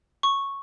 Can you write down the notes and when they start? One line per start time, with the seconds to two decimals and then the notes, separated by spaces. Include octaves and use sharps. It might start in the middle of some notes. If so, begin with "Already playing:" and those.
0.23 C#6